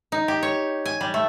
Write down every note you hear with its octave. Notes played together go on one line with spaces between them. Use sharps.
D#4
G4
C#5
G#5
G3
A3